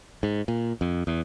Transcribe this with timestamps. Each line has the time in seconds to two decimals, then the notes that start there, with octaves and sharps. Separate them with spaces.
0.23 G#2
0.48 A#2
0.81 F2
1.07 E2